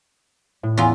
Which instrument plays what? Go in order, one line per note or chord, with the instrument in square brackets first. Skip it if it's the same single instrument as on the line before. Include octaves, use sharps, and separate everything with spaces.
[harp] A2
[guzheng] E2 F4